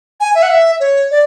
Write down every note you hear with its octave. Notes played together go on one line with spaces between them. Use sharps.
G#5
E5
F#5
E5
C#5
D5